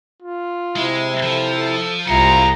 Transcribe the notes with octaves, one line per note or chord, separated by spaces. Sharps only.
F4
C3 G#3 E4
F3 A4
A4
C2 C3 E4 F4 G#4 F#5 A#5